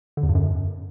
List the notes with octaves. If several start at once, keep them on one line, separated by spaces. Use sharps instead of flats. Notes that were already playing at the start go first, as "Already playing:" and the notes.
D3
E2
G2
F#2